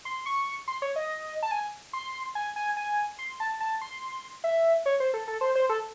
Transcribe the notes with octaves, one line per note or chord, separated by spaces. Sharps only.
C6
C#6
C6
C#5
D#5
A5
G#5
C6
G#5
G#5
G#5
C6
A5
A5
C6
E5
C#5
C5
A4
A4
C5
C5
A4